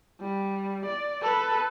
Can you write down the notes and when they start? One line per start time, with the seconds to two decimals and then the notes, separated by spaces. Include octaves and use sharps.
0.21 G3
0.86 D5
1.23 A4 B4